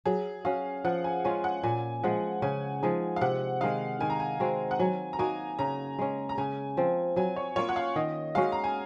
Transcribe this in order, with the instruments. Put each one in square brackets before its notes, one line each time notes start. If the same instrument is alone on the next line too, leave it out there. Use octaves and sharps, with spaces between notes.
[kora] F#3 [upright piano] G#4
[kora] C#4 F#4 [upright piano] F5
[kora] F3 [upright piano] F#5
[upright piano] G#5
[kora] G#3 C#4 F4 [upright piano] G#5
[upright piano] F#5
[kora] A#2 [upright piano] G#5
[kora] F3 G#3 [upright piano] F#5
[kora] C#3 [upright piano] G#5
[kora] F3 G#3 D#4
[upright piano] F5
[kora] C3 [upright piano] F#5
[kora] D#3 G#3 D#4 [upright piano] F5
[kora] D#3 [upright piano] G#5
[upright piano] A#5
G#5
[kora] G#3 C4 F#4
[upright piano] F#5
[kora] F#3 [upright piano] G#5
[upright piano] A#5
[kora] A#3 D#4 F#4 [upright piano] G#5
[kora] C#3 [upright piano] A#5
[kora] G#3 C#4
[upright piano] A#5
[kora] C#3 [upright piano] G#5
[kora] F3 C4
[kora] F#3 [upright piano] G#5
[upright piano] C#5
[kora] A#3 C#4 F4 [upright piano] C#5
[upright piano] F#5
F5
[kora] D#3 [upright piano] D#5
[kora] G#3 C#4 F#4 [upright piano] F5
[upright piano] A#5
G#5